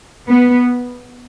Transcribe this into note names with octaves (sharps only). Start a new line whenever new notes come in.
B3